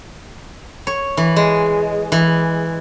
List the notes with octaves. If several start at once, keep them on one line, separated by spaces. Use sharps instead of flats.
C#5
E3
G#3
E3